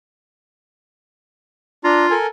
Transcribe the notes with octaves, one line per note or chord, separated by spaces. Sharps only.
D4 F4 A#5
A4 A#4 G#5